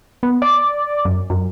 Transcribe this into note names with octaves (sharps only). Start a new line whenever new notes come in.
B3
D5
F#2
F#2